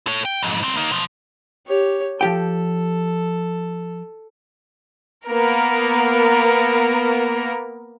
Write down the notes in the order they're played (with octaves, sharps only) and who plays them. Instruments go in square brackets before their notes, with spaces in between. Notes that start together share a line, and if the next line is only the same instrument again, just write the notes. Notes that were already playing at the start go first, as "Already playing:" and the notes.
[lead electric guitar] A4 C#5
G5
F2 G#2
C2 C4
A#3 D#4
B2 F3
[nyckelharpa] G4 C#5
[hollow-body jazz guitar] F3 G4 G5 [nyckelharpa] A4
[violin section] A#3 B3 A#4